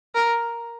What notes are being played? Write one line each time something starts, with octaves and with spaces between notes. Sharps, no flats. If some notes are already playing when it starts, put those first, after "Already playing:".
A#4